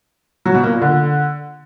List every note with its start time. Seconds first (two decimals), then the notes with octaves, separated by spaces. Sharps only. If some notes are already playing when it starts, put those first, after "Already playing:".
0.46 F#3
0.55 B2
0.63 A#3
0.72 A#2
0.81 D3